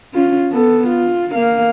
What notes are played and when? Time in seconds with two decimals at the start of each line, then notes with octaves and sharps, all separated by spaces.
0.14 C#4 F4
0.51 B3 A4
0.88 F4
1.33 A#3 F5